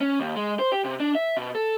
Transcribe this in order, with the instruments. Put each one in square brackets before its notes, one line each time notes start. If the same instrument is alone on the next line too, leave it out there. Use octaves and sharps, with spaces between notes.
[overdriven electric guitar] C#4
D#2
G#3
C5
G4
C3
D4
E5
B2
A4